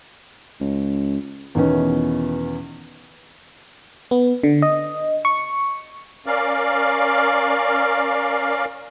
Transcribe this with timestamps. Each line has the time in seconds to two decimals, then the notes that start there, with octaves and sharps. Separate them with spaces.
0.61 C#2
1.55 E2 B2 D#3 E3 B3 C#4
4.11 B3
4.43 D3
4.62 D#5
5.25 C#6
6.27 C#4 A#4 D5 F5